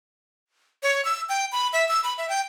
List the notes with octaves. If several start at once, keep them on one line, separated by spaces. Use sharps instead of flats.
C#5
E6
G5
B5
E5
E6
B5
E5
G5